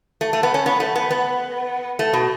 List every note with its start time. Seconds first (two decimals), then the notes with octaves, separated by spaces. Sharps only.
0.21 A3
0.33 A3
0.43 B3
0.54 C#4
0.66 B3
0.80 A3
0.96 B3
1.11 B3
1.99 A3
2.13 B2